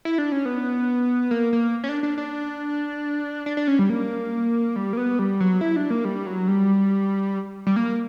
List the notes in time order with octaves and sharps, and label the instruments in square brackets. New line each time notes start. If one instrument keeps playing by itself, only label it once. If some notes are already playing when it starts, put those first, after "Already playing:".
[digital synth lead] E4
D4
C#4
B3
A#3
A#3
C#4
D4
D4
D4
D4
D4
C#4
G3
A#3
G3
A#3
B3
G3
F#3
E4
D4
A#3
G3
F#3
G3
G3
A#3